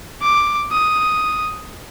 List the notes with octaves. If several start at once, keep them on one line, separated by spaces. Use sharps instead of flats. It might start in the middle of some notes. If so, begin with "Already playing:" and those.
D6
D#6